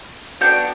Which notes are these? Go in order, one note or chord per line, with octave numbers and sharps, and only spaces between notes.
B3 D4 F#4 G5